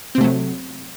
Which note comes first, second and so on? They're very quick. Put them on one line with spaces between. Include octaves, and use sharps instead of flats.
C4 C3 A3 F#3